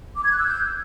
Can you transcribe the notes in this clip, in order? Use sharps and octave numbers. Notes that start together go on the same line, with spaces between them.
D6
G#6
F#6
E6
G6